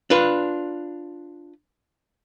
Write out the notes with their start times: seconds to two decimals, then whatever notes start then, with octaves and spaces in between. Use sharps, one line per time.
0.10 D4 F4 B4